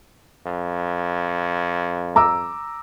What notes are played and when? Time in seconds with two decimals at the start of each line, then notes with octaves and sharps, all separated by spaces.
0.46 F2
2.16 A#5 D6 E6